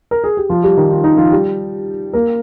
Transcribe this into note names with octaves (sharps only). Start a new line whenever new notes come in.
A#4
G#4
G4
F3 F4
G3 G4
D#3 D#4
F4
D#4
F3 F4
G3 G4
A#3 A#4